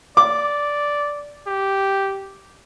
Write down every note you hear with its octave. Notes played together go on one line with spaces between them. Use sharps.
D5 D6
G4